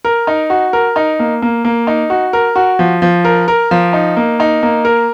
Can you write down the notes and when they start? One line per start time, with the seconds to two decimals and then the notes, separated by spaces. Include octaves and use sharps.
0.05 A#4
0.27 D#4
0.50 F#4
0.73 A#4
0.96 D#4
1.19 A#3
1.42 A#3
1.65 A#3
1.87 D#4
2.10 F#4
2.33 A#4
2.56 F#4
2.79 F3
3.02 F3
3.25 A#4
3.48 A#4
3.71 F3
3.93 D#4
4.17 A#3
4.40 D#4
4.63 A#3
4.85 A#4